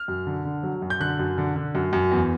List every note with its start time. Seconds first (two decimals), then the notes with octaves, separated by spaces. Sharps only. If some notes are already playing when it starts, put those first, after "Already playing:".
Already playing: F6
0.08 F#2
0.27 D3
0.45 D3
0.63 F#3
0.82 F#2
0.90 G6
1.00 D3 F#6
1.19 F#2
1.38 D3
1.56 D3
1.75 F#2
1.93 F#2
2.12 E2